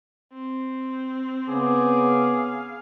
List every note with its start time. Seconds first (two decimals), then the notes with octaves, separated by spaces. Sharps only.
0.33 C4
1.49 C#3 B3 G#4 D6
2.08 F5